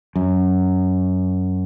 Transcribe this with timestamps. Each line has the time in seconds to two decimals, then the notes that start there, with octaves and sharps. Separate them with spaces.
0.16 F#2